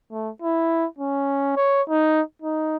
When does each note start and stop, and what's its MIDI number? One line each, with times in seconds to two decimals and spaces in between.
0.12 0.30 57
0.42 0.86 64
0.98 1.55 61
1.57 1.82 73
1.89 2.21 63
2.42 2.77 63